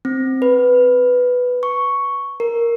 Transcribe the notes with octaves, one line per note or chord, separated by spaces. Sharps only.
C4
B4
C#6
A#4